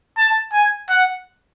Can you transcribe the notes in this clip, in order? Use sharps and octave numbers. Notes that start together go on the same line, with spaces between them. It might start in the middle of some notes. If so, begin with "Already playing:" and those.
A5
G#5
F#5